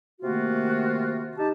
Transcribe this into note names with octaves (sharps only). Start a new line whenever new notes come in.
C3 D#3 A3 A#3 F4 F#4
D#4 G4 A5